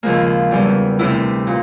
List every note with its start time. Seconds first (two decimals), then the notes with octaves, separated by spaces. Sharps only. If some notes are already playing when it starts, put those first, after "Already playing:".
0.03 D#2 C#3 F3 G#3 A#3
0.51 E2 C#3 E3 G3
0.99 D2 C3 E3 E4
1.47 A#2